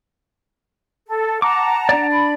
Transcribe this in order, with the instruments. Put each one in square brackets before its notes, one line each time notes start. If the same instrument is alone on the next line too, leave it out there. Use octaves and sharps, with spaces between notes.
[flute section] A4
[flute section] F#5 A5 A#5 [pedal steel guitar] D6
[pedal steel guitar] D4 D5
[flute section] B5